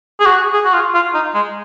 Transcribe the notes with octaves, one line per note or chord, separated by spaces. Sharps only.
G#4
F#4
G#4
F#4
F4
F4
D#4
G#3